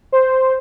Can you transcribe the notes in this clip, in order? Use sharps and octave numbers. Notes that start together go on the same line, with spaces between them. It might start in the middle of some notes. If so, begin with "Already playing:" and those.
C5